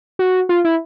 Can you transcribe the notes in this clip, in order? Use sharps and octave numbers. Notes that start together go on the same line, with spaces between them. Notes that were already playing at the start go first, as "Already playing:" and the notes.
F#4
F4
E4